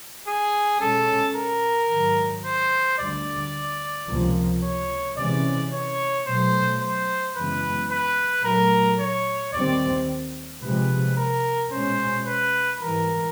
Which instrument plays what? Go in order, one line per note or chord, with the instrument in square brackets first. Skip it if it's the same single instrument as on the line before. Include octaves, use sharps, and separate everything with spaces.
[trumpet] G#4
[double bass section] B2 G#3 C#4 [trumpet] A4
[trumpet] A#4
[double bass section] G#2 D#3 F#3
[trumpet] C5
[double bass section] D2 D3 G3 [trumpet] D5
[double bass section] C#2 C3 F3 A#3
[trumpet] C#5
[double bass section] C3 E3 G#3 C#4 [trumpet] D5
[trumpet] C#5
[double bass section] B2 F#3 A3 [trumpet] C5
[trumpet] C5
[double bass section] F#2 C#3 E3 G#3 B3 [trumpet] B4
[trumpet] B4
[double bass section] A#2 F#3 A3 [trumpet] A#4
[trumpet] C#5
[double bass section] D#2 D#3 G3 C4 [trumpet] D5
[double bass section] C3 F3 G#3 [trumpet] B4
[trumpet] A#4
[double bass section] B2 G#3 C#4 [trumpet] C5
[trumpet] B4
[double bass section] G#2 E3 G3 [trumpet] A#4